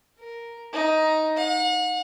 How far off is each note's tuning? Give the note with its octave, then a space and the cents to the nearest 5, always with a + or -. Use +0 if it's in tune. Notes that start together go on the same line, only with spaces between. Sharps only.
A#4 +0
D#4 +10
F#5 -40